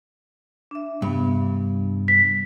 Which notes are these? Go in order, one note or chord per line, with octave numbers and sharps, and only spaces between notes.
D4 E5
G2 C3 B3
B6